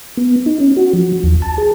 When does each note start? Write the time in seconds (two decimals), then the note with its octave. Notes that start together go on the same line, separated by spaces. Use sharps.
0.17 B3
0.46 D#4
0.60 C#4
0.77 F#4
0.93 F3
1.23 D#2
1.42 A5
1.58 G#4